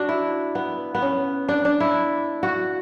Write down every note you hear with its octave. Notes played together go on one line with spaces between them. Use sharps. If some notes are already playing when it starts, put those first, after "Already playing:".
Already playing: D4 F#4
E4
B3
B3
C#4
D4
D4
E4
F#4